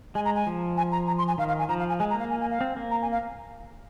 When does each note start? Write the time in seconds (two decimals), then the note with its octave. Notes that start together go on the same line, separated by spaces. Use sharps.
0.15 G#3 G#5
0.25 A#5
0.35 G#5
0.47 F3
0.77 G#5
0.92 A#5
1.07 A#5
1.18 C6
1.28 G#5
1.38 D#3 F5
1.48 F5
1.59 G#5
1.69 F3 A#5
1.79 F5
1.89 G#5
1.99 G#3 G#5
2.10 A#5
2.14 A#3 F5
2.30 G#5
2.41 G#5
2.50 F5
2.61 C4
2.77 A#3
2.91 A#5
3.02 G#5
3.12 F5